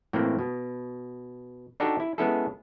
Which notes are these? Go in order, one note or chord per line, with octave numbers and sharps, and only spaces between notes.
A2 E3 A#3 C4
B2
D4 D#4 F#4 G4 A4
E4
G#3 B3 C#4 E4 G#4 A4